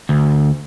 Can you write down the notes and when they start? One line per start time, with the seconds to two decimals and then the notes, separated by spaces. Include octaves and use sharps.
0.09 D2